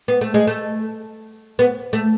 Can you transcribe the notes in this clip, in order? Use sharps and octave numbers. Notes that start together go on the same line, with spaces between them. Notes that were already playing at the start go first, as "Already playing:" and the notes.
B3
A3
G#3
A3
B3
A3